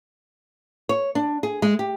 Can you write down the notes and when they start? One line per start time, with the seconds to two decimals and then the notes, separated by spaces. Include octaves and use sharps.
0.89 C#5
1.15 D4
1.43 G#4
1.62 G#3
1.79 G4